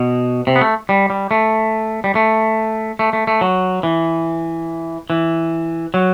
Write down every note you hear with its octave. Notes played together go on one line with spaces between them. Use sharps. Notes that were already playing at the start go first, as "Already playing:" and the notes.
Already playing: B2
C3
B3
A3
G3
G3
A3
G3
A3
A3
A3
A3
F#3
E3
E3
F#3